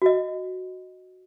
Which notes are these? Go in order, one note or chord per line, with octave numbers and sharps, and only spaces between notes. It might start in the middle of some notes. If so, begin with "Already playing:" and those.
F#4 D#5